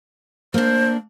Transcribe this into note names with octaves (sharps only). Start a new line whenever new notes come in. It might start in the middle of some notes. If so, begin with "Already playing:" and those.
A#3 D4 C5